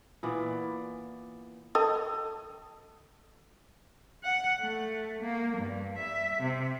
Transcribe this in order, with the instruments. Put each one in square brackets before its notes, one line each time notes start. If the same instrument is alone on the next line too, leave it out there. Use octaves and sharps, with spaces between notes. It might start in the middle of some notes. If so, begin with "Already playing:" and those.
[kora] A#2 E3 B3 D5
[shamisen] A4 D#5 G5
[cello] F#5
A3
A#3
G2
E5
C3